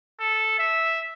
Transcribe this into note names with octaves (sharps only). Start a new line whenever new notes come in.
A4
E5